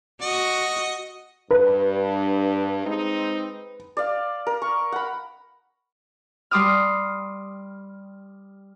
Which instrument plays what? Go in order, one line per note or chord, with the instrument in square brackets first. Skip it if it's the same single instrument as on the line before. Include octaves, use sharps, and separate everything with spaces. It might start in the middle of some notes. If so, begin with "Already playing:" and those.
[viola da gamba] F#4 [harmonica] D#5
[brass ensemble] G2 [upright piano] B4
[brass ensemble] G#3 C4 D#4
[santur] D5 F5
A#4
C#6
F#5 B5
[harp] G3 C6 D6 D#6 F6